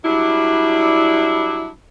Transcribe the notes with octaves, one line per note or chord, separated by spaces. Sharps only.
F#3 G3 D4 E4